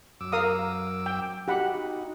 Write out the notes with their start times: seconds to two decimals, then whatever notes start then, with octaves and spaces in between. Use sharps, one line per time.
0.21 F#2 D6 E6
0.32 A#4 F5 D#6
1.06 G5
1.48 D#4 F#4 G4 F#5 B5